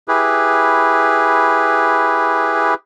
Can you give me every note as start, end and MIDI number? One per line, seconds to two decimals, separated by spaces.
0.08 2.74 64
0.08 2.74 67
0.08 2.74 68
0.08 2.74 71